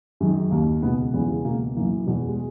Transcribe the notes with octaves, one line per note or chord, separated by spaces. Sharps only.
F#2 D#3 G#3
D#2 D#3 A#3
C#2 B2 G#3 B3
E2 C#3 E3 G#3 B3
G#3
C#2 B2 A#3
F#2 E3 A#3
E2 B2 G#3
G#3